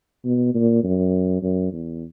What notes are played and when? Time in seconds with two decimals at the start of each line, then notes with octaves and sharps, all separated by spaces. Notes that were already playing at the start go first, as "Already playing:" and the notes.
0.24 B2
0.54 A#2
0.83 F#2
1.43 F#2
1.72 E2